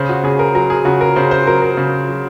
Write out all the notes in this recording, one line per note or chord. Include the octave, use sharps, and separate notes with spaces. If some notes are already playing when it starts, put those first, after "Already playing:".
Already playing: C#3 C5
F#4
C#3 G#4
A#4
F#3 A#4
G#4
C#3 F#4
A#4
C#3 C5
C5
F#3 A#4
A#4
C#3
F#3